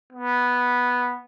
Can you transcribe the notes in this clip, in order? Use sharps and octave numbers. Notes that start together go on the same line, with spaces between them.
B3